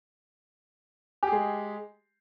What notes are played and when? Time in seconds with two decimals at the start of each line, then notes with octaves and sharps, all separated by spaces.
1.23 G4
1.27 G#4
1.32 G#3